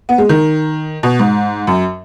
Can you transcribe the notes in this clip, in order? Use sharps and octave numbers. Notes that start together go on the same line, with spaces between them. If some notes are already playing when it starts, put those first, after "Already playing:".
B3
G#3
D#3
B2
G#2
F#2